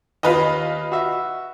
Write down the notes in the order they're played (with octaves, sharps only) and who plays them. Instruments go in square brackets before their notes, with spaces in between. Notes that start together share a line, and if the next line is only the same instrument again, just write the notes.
[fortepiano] D#2 [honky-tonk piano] F4 B4 D#5
[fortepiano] F#4 E5